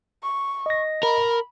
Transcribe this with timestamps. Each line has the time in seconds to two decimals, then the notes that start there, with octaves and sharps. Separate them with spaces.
0.23 C#6
0.66 D#5 A#6
1.03 A#4 B5